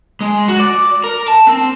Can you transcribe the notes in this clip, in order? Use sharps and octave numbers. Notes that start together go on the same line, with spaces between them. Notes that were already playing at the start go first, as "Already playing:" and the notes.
G#3
F#4
D5
A#4
A5
C4